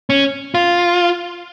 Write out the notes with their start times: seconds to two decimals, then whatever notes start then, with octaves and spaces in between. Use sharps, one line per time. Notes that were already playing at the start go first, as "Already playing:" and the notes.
0.10 C#4
0.55 F4